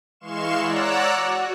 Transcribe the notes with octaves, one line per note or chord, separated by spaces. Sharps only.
E3 G#3 F5 C6 C#6 E7
C#5 D5 F#5 A#5 E6 F#6
F#4